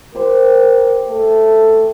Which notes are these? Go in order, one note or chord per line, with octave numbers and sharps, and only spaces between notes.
G4 A#4 C5
A3